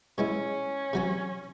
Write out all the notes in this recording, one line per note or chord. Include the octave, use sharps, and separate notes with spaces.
B2 G#3 C#4 E4
C3 F#3 C4